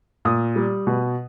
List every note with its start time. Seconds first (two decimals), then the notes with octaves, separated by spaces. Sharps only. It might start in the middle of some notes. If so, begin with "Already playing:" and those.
0.25 A#2 D#6
0.56 G3
0.87 B2